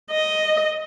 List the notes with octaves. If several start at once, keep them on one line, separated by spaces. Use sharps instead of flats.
D#5